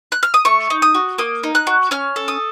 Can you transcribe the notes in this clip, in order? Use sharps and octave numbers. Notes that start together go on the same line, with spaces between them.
F#6
F6
D#6
A3 C#6
D#4
D#6
F#4
A#3 D#6
D#4
F#6
F#4
C#4 F6
A4
D#6